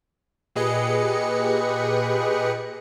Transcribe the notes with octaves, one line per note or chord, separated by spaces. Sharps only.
A#2 G4 G#4 B4 D#5 C#7